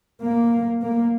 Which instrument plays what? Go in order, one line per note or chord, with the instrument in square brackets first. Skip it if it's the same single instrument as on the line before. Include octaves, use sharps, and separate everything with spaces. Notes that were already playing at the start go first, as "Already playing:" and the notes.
[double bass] A#3
A#3